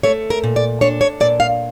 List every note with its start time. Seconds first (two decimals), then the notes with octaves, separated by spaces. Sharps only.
0.03 A3 C#5
0.30 A#4
0.43 A#2
0.56 D5
0.81 D4 C#5
1.01 C#5
1.20 A#2 D5
1.40 F5